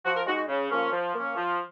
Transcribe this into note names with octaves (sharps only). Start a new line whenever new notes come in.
F3 F#4
A#4
G#3 D#4 F#4
F#4
C#3
F3 A#3 C#4
F3
A#3 C#4
F3